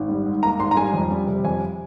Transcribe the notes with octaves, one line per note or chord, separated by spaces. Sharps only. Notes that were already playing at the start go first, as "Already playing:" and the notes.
Already playing: G#1
G3
G#2
A#3 A#5
G#1 C6
A#5
G3 G#5
F2
G3
C3
F2 G#5